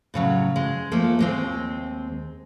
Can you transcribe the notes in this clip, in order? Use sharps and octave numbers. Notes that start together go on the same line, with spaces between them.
A2 C#3 F#3
G#3
F3 A3 A#3 F4
D#2 G#3 C4